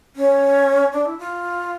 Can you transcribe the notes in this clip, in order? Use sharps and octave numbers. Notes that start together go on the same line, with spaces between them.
C#4
D4
E4
F4